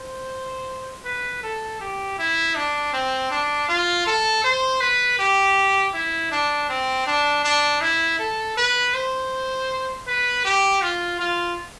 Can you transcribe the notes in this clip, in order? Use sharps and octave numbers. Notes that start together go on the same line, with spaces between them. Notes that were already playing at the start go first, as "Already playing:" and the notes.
Already playing: C5
B4
A4
G4
E4
D4
C4
D4
F4
A4
C5
B4
G4
E4
D4
C4
D4
D4
E4
A4
B4
C5
B4
G4
F4
F4